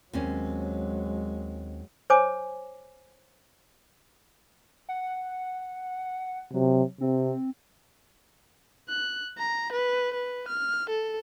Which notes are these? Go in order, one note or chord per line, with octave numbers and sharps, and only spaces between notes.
D#2 F#3 G#3 C4 C#4
C5 C#5 G#5 D6
F#5
C3 F#3
C3 C4
F#6
A#5
B4
B4
F6
A4